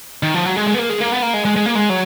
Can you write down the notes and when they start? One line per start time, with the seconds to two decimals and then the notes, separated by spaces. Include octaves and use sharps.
0.23 D#3
0.34 F3
0.45 F#3
0.56 G#3
0.68 G#3
0.74 B3
0.78 A#3
0.89 G#3
1.01 A#3
1.12 B3
1.22 A#3
1.34 G#3
1.45 G#3
1.56 G#3
1.66 A#3
1.75 G#3
1.90 F#3